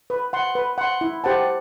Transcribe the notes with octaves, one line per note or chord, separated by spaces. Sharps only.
B4
F#5 C6
B4
F#5 C6
E4
G4 C5 F#5 A5